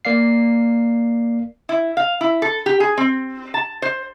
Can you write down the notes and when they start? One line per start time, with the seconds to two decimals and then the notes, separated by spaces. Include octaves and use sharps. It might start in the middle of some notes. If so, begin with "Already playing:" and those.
0.05 A#3 D5 F5 C7
1.69 E4
1.97 F5
2.21 E4
2.42 A4
2.66 G4
2.80 G#4
2.98 C4
3.54 A5
3.82 C5